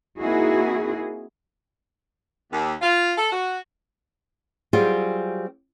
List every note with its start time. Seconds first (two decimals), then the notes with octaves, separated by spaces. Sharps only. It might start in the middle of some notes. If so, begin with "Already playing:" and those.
0.20 A#3 C4 D#4 E4 F#4 G#4
2.53 D#2
2.82 F4
3.18 A4
3.31 F#4
4.73 F#3 G3 C4 F4 G4 G#4